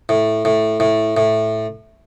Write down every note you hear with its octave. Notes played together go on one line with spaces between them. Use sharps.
A2
A2
A2
A2